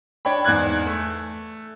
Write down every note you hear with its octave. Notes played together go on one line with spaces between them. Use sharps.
D4 C#5 G5 B5
E2 G#2 D5 F#6 G#6
A3